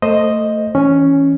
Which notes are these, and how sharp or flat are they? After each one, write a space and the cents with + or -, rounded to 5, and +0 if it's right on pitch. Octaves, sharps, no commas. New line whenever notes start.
A3 +20 C5 +0 D#5 +0
E3 +0 C#4 +0